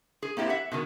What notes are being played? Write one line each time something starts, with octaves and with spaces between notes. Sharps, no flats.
G#4
A#3 C4 E4 G4
E5 F#5
B2 D#3 G#3